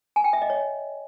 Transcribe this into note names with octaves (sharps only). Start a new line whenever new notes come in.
G#5
G5
E5
D#5
C#5